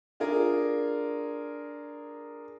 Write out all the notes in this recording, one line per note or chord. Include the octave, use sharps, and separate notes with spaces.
D4 F4 G#4 A#4